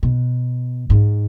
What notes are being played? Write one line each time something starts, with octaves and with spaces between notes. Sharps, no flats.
B2
G#2